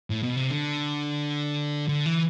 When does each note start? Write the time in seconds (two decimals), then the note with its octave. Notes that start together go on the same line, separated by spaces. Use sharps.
0.10 A2
0.23 B2
0.36 C3
0.51 D3
1.88 D3
2.06 E3